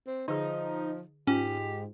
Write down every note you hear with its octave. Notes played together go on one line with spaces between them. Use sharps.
C4
D3 F3 D#4 G#4
G#2 C#4 F4 G4